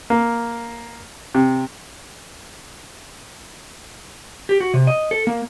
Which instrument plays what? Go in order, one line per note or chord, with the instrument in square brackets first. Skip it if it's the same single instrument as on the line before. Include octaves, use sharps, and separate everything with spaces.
[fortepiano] A#3
C3
[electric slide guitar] G4
F#4
C3
D#5
A4
A#3